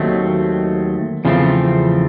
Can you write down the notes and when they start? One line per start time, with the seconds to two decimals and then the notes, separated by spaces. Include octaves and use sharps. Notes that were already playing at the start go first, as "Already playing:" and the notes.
Already playing: D#2 D#3 F#3 A3 C4
1.25 E2 C#3 F3 A3 C4